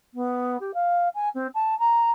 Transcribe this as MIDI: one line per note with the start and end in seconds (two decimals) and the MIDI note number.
0.14 0.57 59
0.60 0.71 67
0.74 1.09 77
1.15 1.29 80
1.35 1.47 60
1.54 1.77 81
1.79 2.11 82